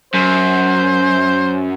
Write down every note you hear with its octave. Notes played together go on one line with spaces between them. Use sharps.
F#2 C5